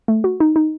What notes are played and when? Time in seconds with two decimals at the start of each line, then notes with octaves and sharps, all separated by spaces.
0.08 A3
0.24 F#4
0.40 D#4
0.56 D#4